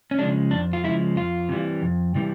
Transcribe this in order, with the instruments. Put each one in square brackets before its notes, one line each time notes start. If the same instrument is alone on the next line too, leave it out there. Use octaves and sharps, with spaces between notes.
[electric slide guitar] C#4
C#3 F3 G#3 D4
F2 D4
F4
C#3 F3 G#3 E4
F2 F4
C3 E3 G3
F2
C3 E3 G3